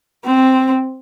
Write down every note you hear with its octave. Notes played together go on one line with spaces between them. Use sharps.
C4